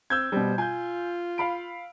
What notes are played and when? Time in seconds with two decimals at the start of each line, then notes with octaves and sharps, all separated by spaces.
0.10 C4 E6 G6 G#6
0.32 B2 G3 C5
0.58 F4 G#5 G6
1.38 F5 B5 D7